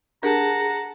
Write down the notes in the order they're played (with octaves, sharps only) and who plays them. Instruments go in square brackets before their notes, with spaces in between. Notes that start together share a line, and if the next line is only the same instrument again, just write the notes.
[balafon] D4 G4 A#4 [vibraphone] G#4 [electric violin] F#5 A5 [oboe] A#5